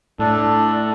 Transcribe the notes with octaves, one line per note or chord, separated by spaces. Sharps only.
A2 D4 A4